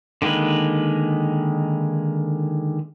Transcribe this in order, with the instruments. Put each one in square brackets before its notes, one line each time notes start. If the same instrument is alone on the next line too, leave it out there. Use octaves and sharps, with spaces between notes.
[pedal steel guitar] D3 D#3 G#3 A#3 B4